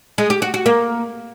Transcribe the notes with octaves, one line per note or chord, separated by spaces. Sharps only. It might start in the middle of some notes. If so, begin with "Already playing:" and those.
G#3
G4
F#4
F#4
A#3